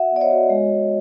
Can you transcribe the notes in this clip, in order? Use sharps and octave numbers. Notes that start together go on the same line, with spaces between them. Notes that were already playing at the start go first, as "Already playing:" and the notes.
Already playing: F#4 E5 F#5
B3 D5
C#5 D#5
F#4
G#3
G#3